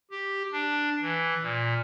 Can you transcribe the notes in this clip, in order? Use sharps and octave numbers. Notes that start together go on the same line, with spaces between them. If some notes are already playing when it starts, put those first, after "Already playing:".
G4
D4
E3
A#2